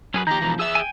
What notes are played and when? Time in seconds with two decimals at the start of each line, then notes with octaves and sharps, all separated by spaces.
0.14 F#2 C#4 G#4 B4
0.27 D#3 F3 G4 A#5 G6
0.42 B2 E3
0.59 G#4 E5 E6
0.75 G5 G#5